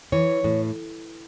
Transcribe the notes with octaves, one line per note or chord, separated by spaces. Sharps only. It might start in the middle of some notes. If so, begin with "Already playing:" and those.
E3 C#5
A2